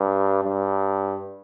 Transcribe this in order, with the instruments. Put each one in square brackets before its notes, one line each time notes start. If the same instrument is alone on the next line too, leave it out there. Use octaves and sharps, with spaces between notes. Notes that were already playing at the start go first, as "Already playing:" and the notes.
Already playing: [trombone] G2
G2